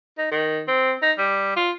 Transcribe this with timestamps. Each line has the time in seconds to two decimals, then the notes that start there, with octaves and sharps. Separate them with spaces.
0.18 D#4
0.31 D#3
0.68 C4
1.02 D#4
1.18 G3
1.57 F4